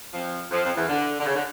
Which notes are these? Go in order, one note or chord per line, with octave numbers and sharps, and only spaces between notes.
F2 F3
F2 F3
F2 F3
E2 E3
D3
D3
C#3
D3